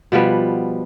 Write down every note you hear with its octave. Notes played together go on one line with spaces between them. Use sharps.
B2 F3 G3 B3